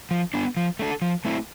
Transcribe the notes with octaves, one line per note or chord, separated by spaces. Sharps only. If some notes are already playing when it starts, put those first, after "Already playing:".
F3
B3 D4
F3
A3 D4 A4
F3
A3 C4 E4